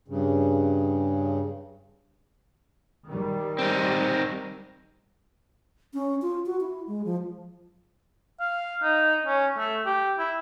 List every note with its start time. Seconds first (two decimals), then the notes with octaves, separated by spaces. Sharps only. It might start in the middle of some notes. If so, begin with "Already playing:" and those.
0.08 G2 C#3
3.08 D#3 G3
3.59 C4 D#4
5.93 C#4
6.22 F4
6.46 F#4
6.60 E4
6.87 G#3
7.05 F3
8.40 F5
8.82 D#4
9.26 C#4
9.58 A3
9.86 G4
10.19 E4